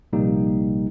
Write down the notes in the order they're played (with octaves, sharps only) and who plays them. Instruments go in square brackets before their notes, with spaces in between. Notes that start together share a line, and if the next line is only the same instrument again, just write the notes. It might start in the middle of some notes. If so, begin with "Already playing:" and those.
[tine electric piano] A#1 C3 G3 A#3 D#4 G4